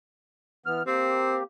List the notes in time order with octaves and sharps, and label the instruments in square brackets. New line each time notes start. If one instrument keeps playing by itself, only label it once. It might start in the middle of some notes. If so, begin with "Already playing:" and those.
[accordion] E3 B3 F6
[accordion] A#3 G4 [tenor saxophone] C4